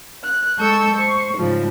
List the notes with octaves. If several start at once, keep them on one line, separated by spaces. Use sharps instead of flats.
F#6
G#3 A4 A5 C#6 E6 G6
C5 C#6
G#2 C#3 F3 G3